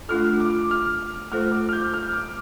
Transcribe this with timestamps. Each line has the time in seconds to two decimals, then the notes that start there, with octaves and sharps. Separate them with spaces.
0.09 A3 D4 F4 A4 F6
0.40 D6
0.71 F6
1.32 A3 F4 A4 C5 F6
1.51 D6
1.69 F6
1.73 G6
1.94 F6
2.13 D6